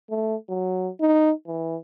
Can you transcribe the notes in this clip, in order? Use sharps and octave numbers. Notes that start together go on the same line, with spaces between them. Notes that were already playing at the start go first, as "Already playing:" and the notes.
A3
F#3
D#4
E3